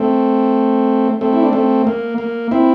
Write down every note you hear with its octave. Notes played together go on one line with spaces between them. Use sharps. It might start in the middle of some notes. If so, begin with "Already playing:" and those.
Already playing: A3 C4
A3 C4
E4
D4
A3 C4
A#3
A#3
C4 E4